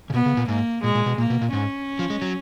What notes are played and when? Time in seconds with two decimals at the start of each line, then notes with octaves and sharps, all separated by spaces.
0.10 C#3
0.14 B2 B3
0.26 C#3
0.37 A#2
0.48 G#2 A#3
0.83 A#2 G#3
0.95 A#2
1.06 B2
1.18 A#2 A#3
1.30 B2
1.41 A#2
1.53 G#2 C#4
1.99 F3
2.10 G#3
2.22 F#3